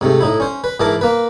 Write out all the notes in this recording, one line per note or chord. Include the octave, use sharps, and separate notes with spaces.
G#2 C3 A3
A2 D#4 E4
C#4 C5
B4
G#2 E3 E4 A#4 A5 D6
A#3 B4